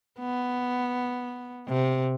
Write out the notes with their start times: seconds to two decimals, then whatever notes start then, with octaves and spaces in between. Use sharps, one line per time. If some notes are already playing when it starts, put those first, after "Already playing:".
0.19 B3
1.68 C3